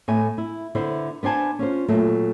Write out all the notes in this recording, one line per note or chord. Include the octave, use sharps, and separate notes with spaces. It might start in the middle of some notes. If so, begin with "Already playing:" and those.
A2 A3 G#5
E4
D3 B3 E4 C5
B3 D4 C5 G#5 A5
C#4 F4 C5
A#2 F#3 A3